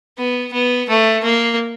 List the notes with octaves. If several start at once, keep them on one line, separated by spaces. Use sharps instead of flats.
B3
B3
A3
A#3